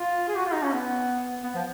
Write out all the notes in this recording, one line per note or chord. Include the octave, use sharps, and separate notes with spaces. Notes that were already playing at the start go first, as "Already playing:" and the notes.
Already playing: F4
G#4
F#4
F4
D#4
C#4
B3
B3
F3